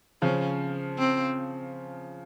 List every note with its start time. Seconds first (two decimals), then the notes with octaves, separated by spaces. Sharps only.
0.21 C#3 F3 C#4
0.98 C4